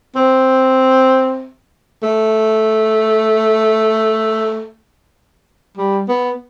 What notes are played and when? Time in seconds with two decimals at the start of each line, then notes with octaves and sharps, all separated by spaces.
0.16 C4
2.03 A3
5.77 G3
6.09 B3